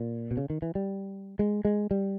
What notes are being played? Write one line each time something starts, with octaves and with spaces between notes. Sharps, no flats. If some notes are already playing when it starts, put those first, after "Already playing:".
Already playing: A#2
B2
C#3
D#3
E3
G3
G#3
G#3
G3